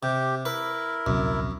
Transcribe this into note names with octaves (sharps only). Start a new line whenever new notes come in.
C3 G4
E4 A#4 B4
D1 A#1 F#2 C3